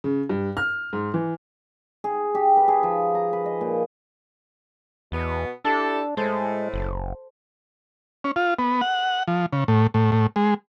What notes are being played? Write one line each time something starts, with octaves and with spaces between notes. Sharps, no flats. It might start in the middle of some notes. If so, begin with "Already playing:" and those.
C#3
G2
F6
G#2
E3
G#4
G4
B4
G#4
F3
A#5
B4
D#5
A#2
E2 B2 B3
D4 E4 G4 A4 A5
A2 G#3 A4 C5
F#1
C#4
F4
B3
F#5
F3
C#3
A2
A2
A2
G#3